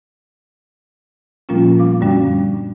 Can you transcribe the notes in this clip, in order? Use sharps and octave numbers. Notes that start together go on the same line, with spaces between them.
A#2 F3 G3 A#3 C#4 F4
B3 F5 D6
F#2 D3 G3 C#4 D4